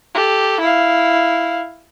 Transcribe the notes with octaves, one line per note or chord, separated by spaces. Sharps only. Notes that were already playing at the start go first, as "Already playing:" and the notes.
G4 A4
E4 F5